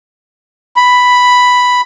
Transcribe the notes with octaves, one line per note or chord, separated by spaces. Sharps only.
B5